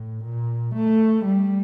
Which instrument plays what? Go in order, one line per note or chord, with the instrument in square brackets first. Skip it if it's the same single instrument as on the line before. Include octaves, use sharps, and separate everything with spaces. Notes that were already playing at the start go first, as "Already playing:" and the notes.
Already playing: [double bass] A2
A#2
A3
G3